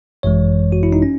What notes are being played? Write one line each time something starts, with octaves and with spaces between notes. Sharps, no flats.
G#1 F#2 E3 G#3 C#5
F#4
E4
D#4
C#4